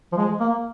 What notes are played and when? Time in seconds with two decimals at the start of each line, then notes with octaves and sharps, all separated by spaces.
0.12 F3
0.17 G#3
0.40 A#3